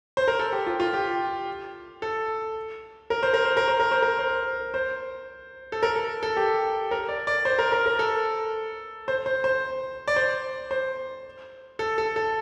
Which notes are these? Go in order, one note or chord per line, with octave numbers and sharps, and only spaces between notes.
C5
A#4
A4
G4
F4
F4
G4
A4
A#4
C5
A#4
C5
A#4
C5
A#4
C5
A#4
C5
C5
A4
A#4
A4
A4
G4
A#4
D5
D5
C5
A#4
A#4
A#4
A4
C5
C5
C5
D5
C5
C5
A4
A4
A4